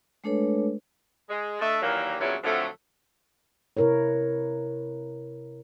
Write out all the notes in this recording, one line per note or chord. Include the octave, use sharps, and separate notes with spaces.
G#3 A3 D4 A4 B4 C#5
G#3
A3 D4 A4 D#5 E5
D#3 E3 F#3 G3 A#3
E2 G2 A#2 F#3 C#4 E4
F2 D3 F3 F#3 A3
C3 E4 A#4 B4 C#5